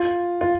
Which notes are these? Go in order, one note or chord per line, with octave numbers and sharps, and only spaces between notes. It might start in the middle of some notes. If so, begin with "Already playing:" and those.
Already playing: F4
F4